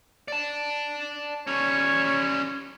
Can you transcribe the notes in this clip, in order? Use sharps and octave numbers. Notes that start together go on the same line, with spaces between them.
D5 A5
G3 C#4 C#5